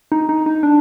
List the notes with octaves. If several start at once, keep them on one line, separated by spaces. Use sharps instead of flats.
D#4
D#4
D#4
D4